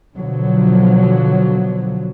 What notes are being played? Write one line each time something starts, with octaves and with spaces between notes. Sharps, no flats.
B2 D3 F3 F#3